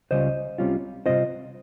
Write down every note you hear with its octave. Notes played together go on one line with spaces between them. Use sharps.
C#2 C#3 G3 C#4 F4 C5 D#5
C2 C3 G3 C#4 F4
C3 G3 C4 F4 C5 D#5